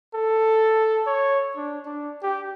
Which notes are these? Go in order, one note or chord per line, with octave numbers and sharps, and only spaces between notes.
A4
C#5
D4
D4
G4